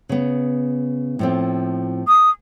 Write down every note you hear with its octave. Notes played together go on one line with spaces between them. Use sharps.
C#3 B3
A2 F3 C4
D#6